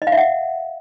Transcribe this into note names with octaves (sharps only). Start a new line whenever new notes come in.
D#5
F5
E5
F#5